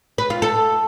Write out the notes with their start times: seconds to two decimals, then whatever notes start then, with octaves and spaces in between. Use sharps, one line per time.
0.18 B4
0.30 F4
0.42 A4